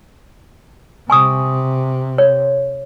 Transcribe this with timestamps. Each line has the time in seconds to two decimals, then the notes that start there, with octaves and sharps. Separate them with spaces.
1.10 C3 G#5 C#6 D#6
2.18 C#5